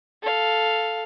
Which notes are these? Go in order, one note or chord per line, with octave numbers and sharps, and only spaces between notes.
A4 F5